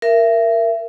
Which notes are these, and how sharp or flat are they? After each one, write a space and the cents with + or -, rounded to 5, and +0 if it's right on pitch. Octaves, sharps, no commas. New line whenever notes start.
A#4 +0 E5 +25